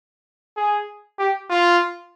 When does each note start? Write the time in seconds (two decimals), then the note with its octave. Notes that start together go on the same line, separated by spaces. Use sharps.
0.57 G#4
1.18 G4
1.50 F4